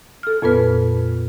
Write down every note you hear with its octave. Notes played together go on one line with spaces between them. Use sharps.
A4 F6
F2 A#2 B3 B4